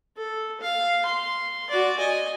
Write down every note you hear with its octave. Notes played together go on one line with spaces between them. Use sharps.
A4
F5
C6
F#4 D5
D#5 G#5